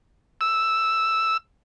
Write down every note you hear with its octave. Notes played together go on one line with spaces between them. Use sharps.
E6